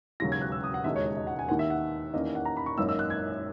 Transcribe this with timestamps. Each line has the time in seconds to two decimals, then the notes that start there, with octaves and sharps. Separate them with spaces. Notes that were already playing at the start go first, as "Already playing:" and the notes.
0.20 E1 D#2 C#3 F#3 A#6
0.32 G#6
0.41 F#6
0.52 E6
0.64 D#6
0.74 F#5
0.84 E1 D#2 C#3 G#3 D#4 E5
0.96 C#5
1.06 D#5
1.17 D#5
1.27 F#5
1.39 G#5
1.49 D#2 D#3 A#3 F#5
1.59 E5
1.70 F#5
2.13 E2 D#3 A#3 C#4 D#5
2.35 F#5
2.45 A#5
2.57 B5
2.66 C#6
2.77 G#1 F#2 D#3 A#3 D#4 E6
2.89 E6
2.99 F#6
3.10 G#6